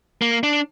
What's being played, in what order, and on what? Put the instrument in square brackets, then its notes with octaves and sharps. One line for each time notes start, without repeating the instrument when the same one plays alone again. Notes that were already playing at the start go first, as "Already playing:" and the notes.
[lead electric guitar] A#3
D4